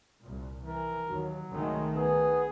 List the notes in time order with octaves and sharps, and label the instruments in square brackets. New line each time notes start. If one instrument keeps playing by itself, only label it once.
[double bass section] C2 A#2
[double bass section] E3 [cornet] A#4
[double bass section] D#2 [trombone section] F#3
[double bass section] C2 D#3 A3 [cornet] G#3
[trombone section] B3 [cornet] G#4